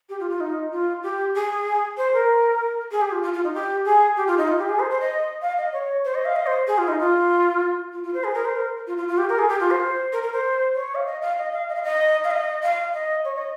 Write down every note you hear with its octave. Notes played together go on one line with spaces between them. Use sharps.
G4
F4
F4
D#4
F4
G4
G#4
C5
A#4
G#4
G4
F4
F4
F4
D#4
G4
G#4
G4
F4
D#4
F4
G4
G#4
C5
C5
D#5
F5
D#5
C#5
C5
D#5
F5
D#5
C5
G#4
F4
D#4
F4
F4
F4
C5
G#4
A#4
C5
A#4
F4
F4
F4
G4
A#4
G#4
G4
F4
C5
A#4
A#4
C5
C#5
F5
D#5
F5
D#5
F5
D#5
F5
D#5
F5
D#5
F5
D#5
C#5
D#5